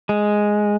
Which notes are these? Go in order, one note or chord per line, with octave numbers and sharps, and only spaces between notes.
G#3